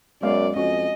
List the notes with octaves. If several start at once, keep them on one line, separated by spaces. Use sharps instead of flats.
F#2 G#3 B3 D5 F5
F2 C#4 F#4 D#5